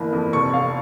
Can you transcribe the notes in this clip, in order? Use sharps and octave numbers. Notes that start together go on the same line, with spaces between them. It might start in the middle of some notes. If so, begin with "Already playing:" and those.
Already playing: G1 E3 A#3
F2
F1 C#6
F2 F5